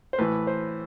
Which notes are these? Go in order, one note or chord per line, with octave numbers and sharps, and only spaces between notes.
C5
A2 E3 B4
C5